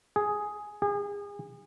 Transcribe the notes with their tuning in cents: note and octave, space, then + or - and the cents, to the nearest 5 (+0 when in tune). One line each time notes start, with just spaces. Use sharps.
G#4 +5
G#4 -35